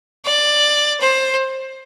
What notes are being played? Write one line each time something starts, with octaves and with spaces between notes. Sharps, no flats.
D5
C5